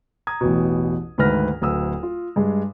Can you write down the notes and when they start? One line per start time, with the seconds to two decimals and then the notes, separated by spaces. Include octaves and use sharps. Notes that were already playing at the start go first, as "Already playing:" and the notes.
0.27 A#5 D#6 G#6
0.41 A1 E2 B2
1.18 D2 G#2 D#3 B4 F6 A#6
1.61 D1 D2 B4 D#6 E6
2.03 F4
2.36 G2 G#3